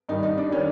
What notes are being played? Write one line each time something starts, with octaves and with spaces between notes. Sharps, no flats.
G2 D#3 G3 D#4
D#4
D4
D#3 G3 C#4